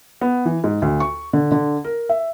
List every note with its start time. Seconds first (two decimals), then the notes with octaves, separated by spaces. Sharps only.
0.21 B3
0.46 E3
0.64 G#2
0.82 D2
1.00 C#6
1.33 D3
1.51 D3
1.85 A#4
2.09 E5